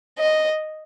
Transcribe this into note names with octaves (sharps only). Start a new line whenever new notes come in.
D#5